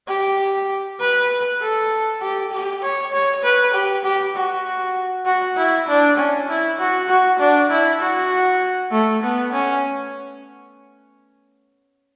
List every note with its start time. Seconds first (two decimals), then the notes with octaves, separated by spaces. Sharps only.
0.08 G4
1.00 B4
1.61 A4
2.21 G4
2.52 G4
2.83 C#5
3.13 C#5
3.43 B4
3.74 G4
4.04 G4
4.35 F#4
5.26 F#4
5.57 E4
5.88 D4
6.18 C#4
6.48 E4
6.79 F#4
7.09 F#4
7.39 D4
7.71 E4
8.00 F#4
8.91 A3
9.23 B3
9.53 C#4